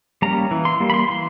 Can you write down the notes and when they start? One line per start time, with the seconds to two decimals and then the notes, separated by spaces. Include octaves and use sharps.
0.22 G3 A#3 C#4 A#5
0.51 E3
0.65 C6
0.80 G3 A#3
0.90 B5
0.94 C6
1.09 E3 C6